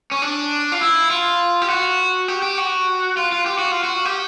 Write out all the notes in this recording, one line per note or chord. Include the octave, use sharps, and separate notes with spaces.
C#4
D4
F4
E4
F4
G4
F#4
G4
G4
F#4
F4
F4
G4
F#4
F4
F#4
G4